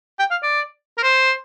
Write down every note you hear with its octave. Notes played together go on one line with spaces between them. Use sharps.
G5
F5
D5
A#4
C5